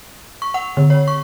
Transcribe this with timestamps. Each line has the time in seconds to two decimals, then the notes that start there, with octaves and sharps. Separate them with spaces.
0.42 C#6
0.54 F#5
0.77 D3
0.90 C#5
1.08 C#6